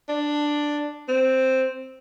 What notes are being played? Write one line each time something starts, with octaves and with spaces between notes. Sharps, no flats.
D4
C4